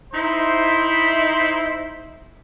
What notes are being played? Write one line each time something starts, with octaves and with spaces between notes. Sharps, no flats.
D#4 E4 C5